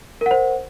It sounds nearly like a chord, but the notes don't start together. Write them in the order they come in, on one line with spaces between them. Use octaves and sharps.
A#4 F#5 C5